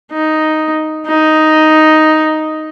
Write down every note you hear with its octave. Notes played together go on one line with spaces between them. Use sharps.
D#4
D#4